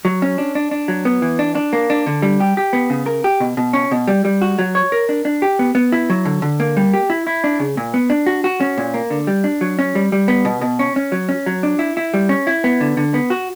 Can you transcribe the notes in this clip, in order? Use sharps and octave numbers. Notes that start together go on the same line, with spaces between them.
F#3
C#4
D4
D4
D4
F#3
B3
E3
D4
D4
A#3
D4
D3
G3
G4
G4
B3
C#3
A#4
G4
B2
B2
C#4
B2
G3
G3
F#4
F#3
C#5
A#4
D4
D4
G4
B3
B3
E4
F#3
D3
D3
A#3
G3
G4
E4
E4
D4
C#3
A#2
B3
D4
F#4
F#4
C#4
A#2
A#3
D3
G3
D4
F#3
C#4
G3
G3
B3
B2
B2
C#4
C#4
F#3
C#4
F#3
D4
E4
E4
G3
C#4
E4
B3
D3
D3
B3
F#4